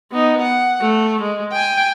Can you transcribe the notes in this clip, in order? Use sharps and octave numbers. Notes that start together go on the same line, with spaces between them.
B3 D#4
F#5
A3
G#3
G5 G#5